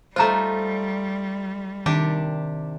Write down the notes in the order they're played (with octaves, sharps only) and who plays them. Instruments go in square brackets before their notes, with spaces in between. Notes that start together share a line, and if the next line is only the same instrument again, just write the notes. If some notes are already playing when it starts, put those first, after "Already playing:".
[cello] G3 [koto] A3 D#4 F4 [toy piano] C5 A#5
[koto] C3 D4 G4 [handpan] D#3